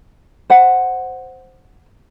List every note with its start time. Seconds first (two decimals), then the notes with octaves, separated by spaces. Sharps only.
0.50 C5 F#5